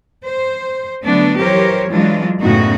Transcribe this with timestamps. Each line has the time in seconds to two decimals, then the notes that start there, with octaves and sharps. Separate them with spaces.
0.25 C5
1.04 D3 F#3 A3 B3 D4
1.38 E3 F#3 G4 A#4 C5 C#5
1.91 E3 F#3 G#3 D4 F4
2.40 F#2 A2 C#3 B3 D#4 F#4